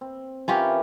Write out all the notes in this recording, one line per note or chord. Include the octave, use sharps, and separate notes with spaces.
C4
E3 C#4 F4 G4 A#4